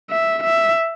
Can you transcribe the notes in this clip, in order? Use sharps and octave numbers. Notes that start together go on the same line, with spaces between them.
E5
E5